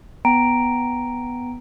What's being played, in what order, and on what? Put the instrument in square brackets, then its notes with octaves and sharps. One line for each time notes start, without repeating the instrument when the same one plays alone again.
[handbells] B3 G5 A#5 D7